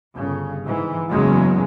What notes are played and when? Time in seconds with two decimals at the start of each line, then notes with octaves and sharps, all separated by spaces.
0.15 G1 C#3
0.64 G#2 E3
1.10 F#1 E2 C#3 F#3 G#3